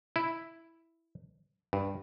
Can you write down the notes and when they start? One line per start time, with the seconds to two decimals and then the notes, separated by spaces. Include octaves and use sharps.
0.16 E4
1.73 G2